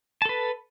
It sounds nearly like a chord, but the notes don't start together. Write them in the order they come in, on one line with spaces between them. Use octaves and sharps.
A5 A4 B4